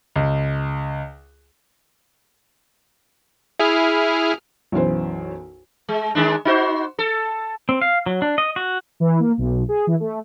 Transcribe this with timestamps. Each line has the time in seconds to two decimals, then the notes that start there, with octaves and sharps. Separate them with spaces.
0.16 C#2
3.59 E4 G#4 F6
4.72 B1 F#2 E3 C5
5.89 G#3
6.15 D#3 G#3 D4
6.45 D#4 F#4 C5
6.99 A4
7.69 C4
7.81 F5
8.06 F#3
8.22 D4
8.38 D#5
8.56 F#4
9.00 E3
9.20 A#3
9.38 B1
9.69 G#4
9.87 E3
10.00 A3